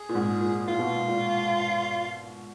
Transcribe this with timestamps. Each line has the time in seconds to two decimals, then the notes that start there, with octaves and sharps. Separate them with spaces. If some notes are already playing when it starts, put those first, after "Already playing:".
Already playing: G#4
0.09 A#2
0.15 G#2
0.41 A#2
0.67 A#2 F4
0.79 B2
0.90 A#2
1.08 A#2